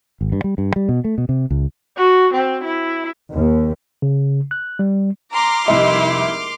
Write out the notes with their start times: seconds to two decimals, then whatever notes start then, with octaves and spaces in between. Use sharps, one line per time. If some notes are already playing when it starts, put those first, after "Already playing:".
0.21 G#1
0.32 G2
0.44 G3
0.58 G2
0.76 G3
0.89 B2
1.04 A3
1.18 B2
1.29 C3
1.50 C#2
1.97 F#4
2.34 C4
2.64 E4
3.32 D#2
4.02 C#3
4.51 F#6
4.79 G3
5.33 A#5 C6 D6 F6
5.68 F1 C2 G#3 A#3 E4 E5